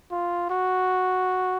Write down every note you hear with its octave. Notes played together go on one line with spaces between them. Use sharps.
F4
F#4